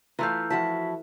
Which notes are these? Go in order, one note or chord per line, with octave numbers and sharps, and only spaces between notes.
E3 A3 F4 F5 A#5 E6 G6
F3 E4 F#4 A5 B6